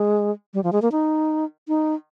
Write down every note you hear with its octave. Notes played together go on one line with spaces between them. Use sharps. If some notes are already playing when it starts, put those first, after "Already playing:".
Already playing: G#3
G3
F3
G#3
A#3
D#4
D#4